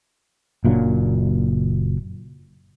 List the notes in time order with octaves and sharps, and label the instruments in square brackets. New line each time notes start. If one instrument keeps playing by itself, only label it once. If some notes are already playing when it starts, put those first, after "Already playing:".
[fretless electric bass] F#1 A#2 F#3 D4